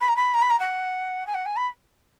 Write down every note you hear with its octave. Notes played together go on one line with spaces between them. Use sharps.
B5
A#5
B5
A#5
B5
A#5
F#5
G#5
F#5
G#5
B5